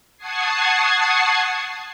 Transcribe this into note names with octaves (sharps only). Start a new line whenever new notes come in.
F#5 A5 C#6 D#6 G#6 C7